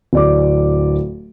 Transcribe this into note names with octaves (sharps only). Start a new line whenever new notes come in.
D1 D5 D6